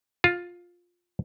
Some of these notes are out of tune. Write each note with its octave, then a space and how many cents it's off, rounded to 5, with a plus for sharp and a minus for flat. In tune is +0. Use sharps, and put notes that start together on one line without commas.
F4 +10